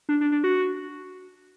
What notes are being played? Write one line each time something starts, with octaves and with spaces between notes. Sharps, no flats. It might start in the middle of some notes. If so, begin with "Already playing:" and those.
D4
D4
D4
F#4